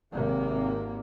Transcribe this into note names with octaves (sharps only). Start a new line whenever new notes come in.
G#1 C3 A#3